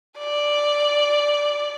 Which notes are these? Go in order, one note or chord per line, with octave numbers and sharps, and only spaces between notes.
D5